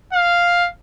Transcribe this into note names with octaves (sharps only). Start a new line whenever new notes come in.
F5